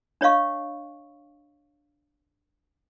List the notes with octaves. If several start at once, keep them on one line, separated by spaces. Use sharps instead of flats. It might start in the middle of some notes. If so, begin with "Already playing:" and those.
D4 C#5 D#5 F5 C#6